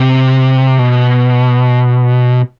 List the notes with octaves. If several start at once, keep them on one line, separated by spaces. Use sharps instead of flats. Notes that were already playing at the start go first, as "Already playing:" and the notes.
Already playing: C3
B2